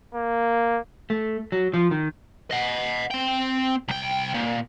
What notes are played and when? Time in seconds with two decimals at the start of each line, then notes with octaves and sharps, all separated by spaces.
0.14 A#3
1.10 A3
1.52 F#3
1.74 F3
1.91 D#3
2.51 D#5 F#5
3.10 C4 G5
3.88 C2 G5
4.35 A#2